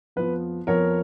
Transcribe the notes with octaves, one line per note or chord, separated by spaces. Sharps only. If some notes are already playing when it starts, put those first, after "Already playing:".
F2 F3 B3 B4
F2 F3 B3 A#4 C#5